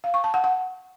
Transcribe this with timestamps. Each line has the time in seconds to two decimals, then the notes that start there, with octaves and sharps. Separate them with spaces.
0.04 F5
0.14 C#6
0.24 A5
0.34 F#5
0.44 F#5